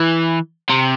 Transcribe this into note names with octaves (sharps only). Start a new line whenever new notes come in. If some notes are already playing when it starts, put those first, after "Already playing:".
Already playing: E3
C3